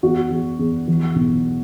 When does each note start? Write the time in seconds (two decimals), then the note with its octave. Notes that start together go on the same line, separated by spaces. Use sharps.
0.03 E2 F#4
0.30 E2
0.59 E2
0.88 E3
1.16 B1